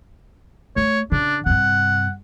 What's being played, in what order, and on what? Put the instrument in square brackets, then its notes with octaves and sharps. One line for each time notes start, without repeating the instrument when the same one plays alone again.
[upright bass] A3 [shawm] C#5
[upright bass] C#3 [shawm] D4
[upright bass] G2 C3 [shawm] F#5